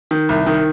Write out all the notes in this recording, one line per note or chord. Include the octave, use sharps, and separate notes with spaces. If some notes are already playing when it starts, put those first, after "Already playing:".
D#3
C2
D#3